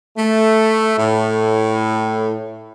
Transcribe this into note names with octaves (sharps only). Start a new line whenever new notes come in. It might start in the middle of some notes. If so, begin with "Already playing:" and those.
A3
A2